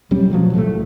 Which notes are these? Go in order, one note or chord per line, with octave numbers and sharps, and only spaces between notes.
E1 F#3 G3 C#4
B2 F3 F#3 A3
C2 A2 F#3 A3